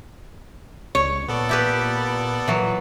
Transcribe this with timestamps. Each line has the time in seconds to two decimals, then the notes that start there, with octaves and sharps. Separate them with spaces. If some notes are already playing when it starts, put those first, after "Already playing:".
0.95 C#2 C#5
1.29 A#2 B3 A4 D5
1.49 E4 G4 B4
2.48 A#2 E3 F#3